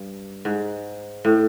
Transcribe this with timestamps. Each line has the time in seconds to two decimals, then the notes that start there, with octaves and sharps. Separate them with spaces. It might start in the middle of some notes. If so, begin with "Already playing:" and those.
Already playing: G2
0.45 G#2
1.25 A2